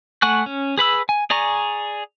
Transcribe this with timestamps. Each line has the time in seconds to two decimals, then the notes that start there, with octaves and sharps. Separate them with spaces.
0.22 A3 F#5 G#5 C#6 F#6
0.46 C#4
0.78 G#4 B4 B5 E6
1.09 G#5
1.30 G#4 D5 G#5 A#5 C#6